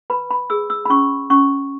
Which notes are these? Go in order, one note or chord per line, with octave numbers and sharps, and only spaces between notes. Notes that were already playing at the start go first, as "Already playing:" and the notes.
B4 B5
B5
G#4 E6
E6
B5
C#4 C#6
C#4 C#6